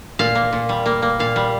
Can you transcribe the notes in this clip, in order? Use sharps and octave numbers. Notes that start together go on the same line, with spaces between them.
A#2 F5
A#3
A#2
G3
A#3
A#3
A#2 F5
G3